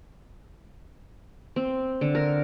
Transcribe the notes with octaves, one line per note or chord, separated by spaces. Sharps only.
C4
D3
A#4